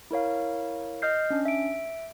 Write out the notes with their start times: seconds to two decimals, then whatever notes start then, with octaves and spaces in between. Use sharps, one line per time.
0.11 E4 A#4 C#5 F5
1.02 D#5 F6 G6 C7
1.30 C#4 D4
1.45 E5 D7